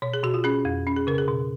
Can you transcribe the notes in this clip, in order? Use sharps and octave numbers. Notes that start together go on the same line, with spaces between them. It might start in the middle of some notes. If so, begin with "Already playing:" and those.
B2 C#5
G#4
B2 F#4
F4
C#4 G#4
F2
C#4
G#4
C#3 A#4
G#4
B2